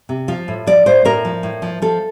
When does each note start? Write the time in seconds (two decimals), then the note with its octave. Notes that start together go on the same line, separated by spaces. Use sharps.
0.09 C3
0.28 F3 F4
0.48 A2
0.67 F3 D5
0.86 A2 C5
1.05 A2 A#4
1.25 F3
1.43 A2
1.62 F3
1.82 F3 A4